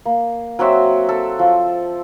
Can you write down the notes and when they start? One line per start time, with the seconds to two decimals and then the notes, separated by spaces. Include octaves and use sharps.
0.05 A#3
0.59 F#3 C4 F#4 E5
1.09 A4
1.39 F3